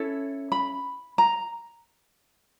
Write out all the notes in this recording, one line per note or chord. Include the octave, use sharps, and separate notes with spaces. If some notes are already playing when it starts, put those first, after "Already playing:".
Already playing: C#4 E4 A4
B5
A#5